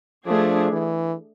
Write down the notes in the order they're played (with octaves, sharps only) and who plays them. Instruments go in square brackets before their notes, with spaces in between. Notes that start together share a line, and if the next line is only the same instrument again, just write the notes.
[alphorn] F3 [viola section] A3 D4 G#4
[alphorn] E3